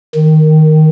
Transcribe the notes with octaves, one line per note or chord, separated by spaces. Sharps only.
D#3